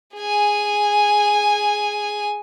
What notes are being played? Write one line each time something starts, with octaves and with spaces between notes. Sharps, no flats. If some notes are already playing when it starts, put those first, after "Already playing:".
G#4 G#5